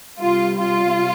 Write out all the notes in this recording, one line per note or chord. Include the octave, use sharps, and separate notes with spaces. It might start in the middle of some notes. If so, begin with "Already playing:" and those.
C3 G3 F4
F4